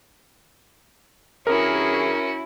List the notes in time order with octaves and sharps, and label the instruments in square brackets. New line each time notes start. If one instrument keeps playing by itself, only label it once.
[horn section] G2 E3 G#4 [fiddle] C#4 F#4 [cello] E4 [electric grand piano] A#4